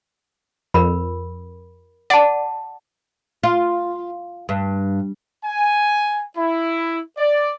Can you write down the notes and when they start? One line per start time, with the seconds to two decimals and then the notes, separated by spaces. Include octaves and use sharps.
0.74 F2 A#4 B5
2.10 D5 F#5 A5
3.43 F4
4.49 G2
5.44 G#5
6.36 E4
7.17 D5